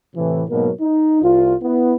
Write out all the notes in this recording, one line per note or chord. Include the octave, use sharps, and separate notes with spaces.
A2 C3 E3
G#2 B2 F#3 A#3 A#4
D#4
C2 F4
B3 E4